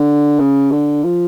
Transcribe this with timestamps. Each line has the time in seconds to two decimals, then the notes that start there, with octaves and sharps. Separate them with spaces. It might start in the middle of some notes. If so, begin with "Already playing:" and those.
Already playing: D3
0.40 C#3
0.72 D3
1.04 F3